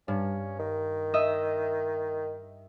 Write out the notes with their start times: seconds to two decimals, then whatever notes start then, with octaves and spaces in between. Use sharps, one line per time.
0.08 G2 C#4
0.59 D#3
1.14 D#5 E5